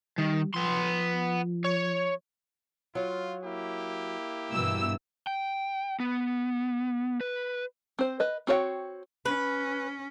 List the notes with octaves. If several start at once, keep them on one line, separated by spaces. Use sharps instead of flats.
D#3 G3
F3 B3 C6
C#5
F#3 F4
A#3 E4 G4
G2 B2 E3 E6
G5
B3
B4
C4 C5
B4 D#5
C4 F#4 C#5 D5 G5
C#4 B4